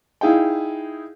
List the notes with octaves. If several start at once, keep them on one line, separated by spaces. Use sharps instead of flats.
D#4 E4 G#4 F5 G5